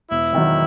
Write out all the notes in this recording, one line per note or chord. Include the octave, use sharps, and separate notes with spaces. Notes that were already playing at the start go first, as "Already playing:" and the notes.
E1 E4
E2 D#3 F#3